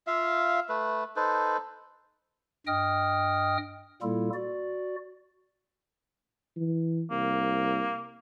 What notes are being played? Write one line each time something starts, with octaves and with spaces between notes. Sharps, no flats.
F4 E5 F5
A3 B4
D#4 A4 B4 C5
G2 D#5 G5 D#6 F6
A#2 G3 A#3 E4 F4 A4
F#4 D5
E3
C2 A#3